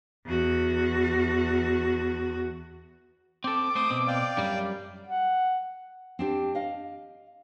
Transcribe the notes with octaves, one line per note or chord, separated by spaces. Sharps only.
E2 F#4
C4 A4 D6
A3 C5 D#6
B2 C4
D5 F5 G5
F#2 G3
F#5
C4 D4 G4
D#5 F5